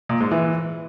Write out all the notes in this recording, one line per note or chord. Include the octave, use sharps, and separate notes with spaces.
A#2
G#2
E3